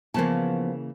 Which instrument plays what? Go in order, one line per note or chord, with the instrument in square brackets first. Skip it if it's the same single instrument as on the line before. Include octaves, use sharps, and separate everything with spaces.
[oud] C#3 E3 A#3 [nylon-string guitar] F3 B3 A5